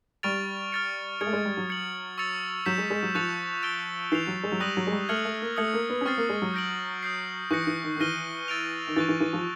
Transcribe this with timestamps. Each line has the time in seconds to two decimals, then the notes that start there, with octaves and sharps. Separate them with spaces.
0.23 G3 C#6 F6 A6 D7 F7
0.72 F6 A6 C#7
1.21 G#3 D#6 G#6 C#7
1.27 A3
1.33 G#3
1.45 G3
1.57 F#3
1.70 G#6 C#7 F#7
2.18 C#6 E6 A6 C#7 F7
2.66 F#3 G6 B6 E7
2.78 G#3
2.90 G#3
3.03 F#3
3.15 F3 C#6 F#6 A6 C#7 F7
3.63 E6 A6 D7 G7
4.12 E3 G6 C7 F7
4.27 F#3
4.43 G#3
4.52 F#3
4.60 G3 D#6 F#6 A#6 D#7 F#7
4.77 F#3
4.87 G#3
4.92 G3
5.09 A3 F6 G#6 C#7 F#7
5.25 A3
5.42 A#3
5.57 A3 D#6 G#6 C#7 F#7
5.73 A#3
5.90 B3
6.01 C#4
6.06 C4 C#6 F6 A6 C7
6.17 A#3
6.29 G#3
6.42 F#3
6.54 G6 A#6 D7 F#7
7.03 D#6 G6 C7
7.51 E3 C#6 F#6 A#6 C#7
7.67 E3
7.83 D#3
7.96 D#3
8.00 E3 F6 A#6 D#7 G7
8.48 E6 A6 D7 F7
8.87 D#3
8.96 E3 C#6 F#6 A6
9.09 E3
9.20 E3
9.33 F3